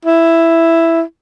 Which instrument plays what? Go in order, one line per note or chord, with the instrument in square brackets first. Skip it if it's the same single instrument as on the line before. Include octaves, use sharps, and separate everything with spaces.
[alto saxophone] E4